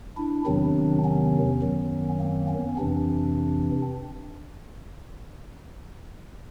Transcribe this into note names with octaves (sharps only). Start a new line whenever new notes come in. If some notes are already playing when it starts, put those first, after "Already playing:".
D4 E4
E2 C3 D#3 F#3 C4 D4
B3 C#4
F#2 D#3 F#3
A#3 C4
B3 C#4
F2 C3 E3 C4 D4